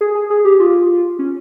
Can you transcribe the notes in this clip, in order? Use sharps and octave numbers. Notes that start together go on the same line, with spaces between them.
G#4
G#4
G#4
G4
F4
C#4